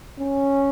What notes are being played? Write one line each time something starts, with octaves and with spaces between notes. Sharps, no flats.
C#4